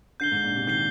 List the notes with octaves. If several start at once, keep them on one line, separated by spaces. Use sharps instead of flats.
D3 G6 C7 G7
G#2
A#2
C3
D#3 G6 C7 G7